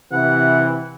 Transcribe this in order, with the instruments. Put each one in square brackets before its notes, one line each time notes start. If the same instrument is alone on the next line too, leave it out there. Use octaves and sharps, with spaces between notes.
[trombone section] C3 E3 [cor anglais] F#5